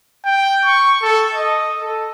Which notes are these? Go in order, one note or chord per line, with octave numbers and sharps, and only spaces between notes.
G5
C#6
A4
D#5
A4